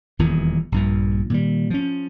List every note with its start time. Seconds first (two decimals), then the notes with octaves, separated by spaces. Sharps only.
0.19 D#1 E2 A#2 D#3
0.72 A#1 G2 A#2
1.30 A#2 D#3 G3
1.70 F3 C#4